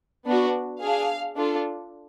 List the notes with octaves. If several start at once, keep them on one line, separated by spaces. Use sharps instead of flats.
B3 D4 F#4
D4 G#4 F5
D4 F4 A4